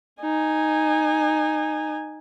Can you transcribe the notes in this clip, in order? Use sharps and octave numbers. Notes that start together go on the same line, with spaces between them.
D#4 G#5